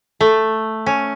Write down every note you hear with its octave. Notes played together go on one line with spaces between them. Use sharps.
A3
C#4